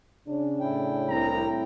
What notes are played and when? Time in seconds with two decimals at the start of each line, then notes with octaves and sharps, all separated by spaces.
0.28 C#3 C#4 D4
0.60 A2 E4 G5
1.09 C2 A#5